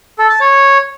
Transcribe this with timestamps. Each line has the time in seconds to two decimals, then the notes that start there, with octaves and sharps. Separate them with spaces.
0.18 A4
0.30 A5
0.41 C#5